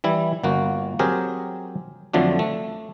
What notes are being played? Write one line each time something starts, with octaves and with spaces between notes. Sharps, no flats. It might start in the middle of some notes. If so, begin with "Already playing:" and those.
E3 G3 E4
G1 A#3 F#4
F#3 C4 G4 G#4 A#4
F2 D3 F3 F#3 A3 D4
A3